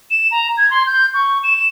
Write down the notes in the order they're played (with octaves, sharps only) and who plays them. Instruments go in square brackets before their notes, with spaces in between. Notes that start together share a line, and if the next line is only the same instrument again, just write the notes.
[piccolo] E7
A#5
G#6
C6
G6
C#6
E7